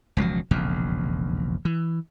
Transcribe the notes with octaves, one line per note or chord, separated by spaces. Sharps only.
E1 C#2 F3 F#3
E1 A#1 F2 C#3
E3